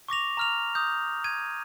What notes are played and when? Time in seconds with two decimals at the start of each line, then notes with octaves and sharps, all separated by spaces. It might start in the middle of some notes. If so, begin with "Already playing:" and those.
0.09 C#6 D6 A#6 F7
0.37 A#5 F6 F7
0.75 D#6 G6
1.24 G#6 D#7